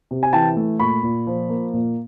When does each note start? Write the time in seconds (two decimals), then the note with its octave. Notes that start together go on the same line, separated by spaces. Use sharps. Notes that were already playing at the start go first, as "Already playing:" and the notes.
0.11 C3
0.23 G#5
0.33 E3 G5 A5
0.57 A3
0.80 A#2 B5 C#6
1.03 A#2
1.27 F3
1.50 A#3
1.73 A#2